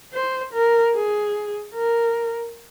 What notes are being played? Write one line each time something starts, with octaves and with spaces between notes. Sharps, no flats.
C5
A#4
G#4
A#4